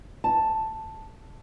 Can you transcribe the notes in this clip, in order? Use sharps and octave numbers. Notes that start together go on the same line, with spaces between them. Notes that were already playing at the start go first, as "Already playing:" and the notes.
A5